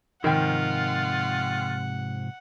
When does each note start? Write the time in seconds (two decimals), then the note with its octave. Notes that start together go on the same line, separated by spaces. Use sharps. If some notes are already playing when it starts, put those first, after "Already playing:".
0.24 G#2 C3 D#3 F3 F4 F#5 G5